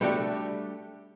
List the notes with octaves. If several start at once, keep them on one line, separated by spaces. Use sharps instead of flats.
G3 A3 D4 F#4 G4